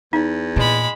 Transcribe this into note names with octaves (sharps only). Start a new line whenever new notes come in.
E2 D#4
A#2 G#3 B5